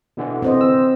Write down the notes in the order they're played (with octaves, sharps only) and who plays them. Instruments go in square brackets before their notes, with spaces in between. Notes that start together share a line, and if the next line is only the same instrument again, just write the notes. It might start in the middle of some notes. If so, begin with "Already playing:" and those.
[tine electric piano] B2 D3 E3
[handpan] C4 C5 D#5
[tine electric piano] E6